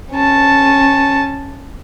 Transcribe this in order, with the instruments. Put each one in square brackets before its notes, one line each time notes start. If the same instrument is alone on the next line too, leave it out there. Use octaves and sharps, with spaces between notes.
[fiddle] C#4 A5